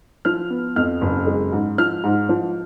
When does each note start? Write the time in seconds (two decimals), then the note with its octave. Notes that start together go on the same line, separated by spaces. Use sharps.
0.25 F3 F6
0.50 B3
0.76 F2 F6
1.01 F#1
1.27 G#3
1.52 G#2
1.78 F3 F6
2.04 G#2
2.29 F3